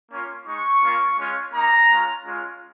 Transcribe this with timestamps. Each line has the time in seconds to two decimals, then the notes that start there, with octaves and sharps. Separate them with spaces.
0.09 A#3 C#4 F4
0.45 G#3 D#4 C#6
0.82 A#3 C#4 F4
1.18 G#3 C#4 F4
1.53 A#3 D#4 A#5
1.89 G#3 C#4 F4
2.26 G#3 C#4 F4